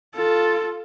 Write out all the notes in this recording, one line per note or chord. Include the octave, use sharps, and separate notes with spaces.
F4 A4